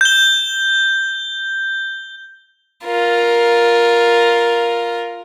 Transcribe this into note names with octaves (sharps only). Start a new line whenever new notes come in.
G6 G7
F4 A#4